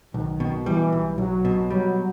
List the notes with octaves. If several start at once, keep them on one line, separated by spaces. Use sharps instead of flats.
B1 D#3
B2
E3 G3
B1
B1 F#3
B2
F#3 G3